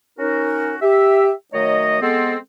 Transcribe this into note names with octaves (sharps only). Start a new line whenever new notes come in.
C#4 D#4 F#4 A#4
G4 E5
D#3 F#3 A3 C#5 D#5
G#3 B3 C4 A4